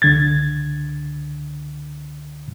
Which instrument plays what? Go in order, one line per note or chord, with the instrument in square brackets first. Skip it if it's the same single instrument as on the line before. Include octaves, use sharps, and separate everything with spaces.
[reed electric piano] C#2 D3 G#6 A6